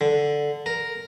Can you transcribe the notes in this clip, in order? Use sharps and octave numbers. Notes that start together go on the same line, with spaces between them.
D3
A#4